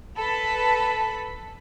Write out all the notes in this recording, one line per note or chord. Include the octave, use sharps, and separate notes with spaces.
A4 B4 B5